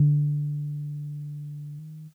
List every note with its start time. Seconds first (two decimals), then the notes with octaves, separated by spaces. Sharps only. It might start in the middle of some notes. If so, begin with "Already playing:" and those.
Already playing: D3
1.79 D#3